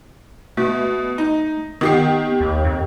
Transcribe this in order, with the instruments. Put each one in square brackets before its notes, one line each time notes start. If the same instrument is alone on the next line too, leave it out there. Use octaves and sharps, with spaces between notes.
[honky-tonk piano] B2 [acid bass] A3
[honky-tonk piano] D#4
[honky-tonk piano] D#3 G4 C7 [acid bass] B3
[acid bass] D#2
F2